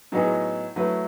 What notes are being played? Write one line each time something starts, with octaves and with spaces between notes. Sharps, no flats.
A2 F#3 B3 D#4 G#4
F#3 A3 E4 B4